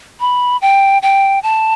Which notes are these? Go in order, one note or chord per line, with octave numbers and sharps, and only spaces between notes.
B5
G5
G5
A5